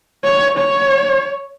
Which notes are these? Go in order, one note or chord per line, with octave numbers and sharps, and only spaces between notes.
C#5
C#5